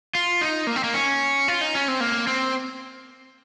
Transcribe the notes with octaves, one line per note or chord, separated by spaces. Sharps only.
F4
D#4
A#3
C4
A#3
C#4
F4
D#4
C#4
C4
A#3
C4